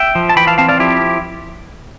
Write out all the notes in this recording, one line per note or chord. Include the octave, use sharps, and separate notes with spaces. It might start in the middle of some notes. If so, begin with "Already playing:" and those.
Already playing: E5 G5
F3
A5
E3 G5 B5
F5 A5
C4 F5 A5
D5 F5
F3 E4 G4